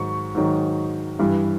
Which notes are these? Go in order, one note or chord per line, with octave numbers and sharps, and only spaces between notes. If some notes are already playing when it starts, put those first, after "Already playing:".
Already playing: G#2 D#3 F#3 C#6
G#2 D#3 F#3
G2 E3 G3